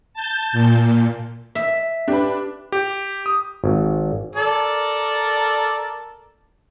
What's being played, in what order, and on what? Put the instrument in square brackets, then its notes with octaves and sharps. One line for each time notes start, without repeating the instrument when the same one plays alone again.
[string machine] A5 G6
A#2
[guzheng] E5
[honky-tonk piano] D4 [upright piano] G4 B4
[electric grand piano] G4
D#6
[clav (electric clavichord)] G#1
[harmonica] A4 A#4 D5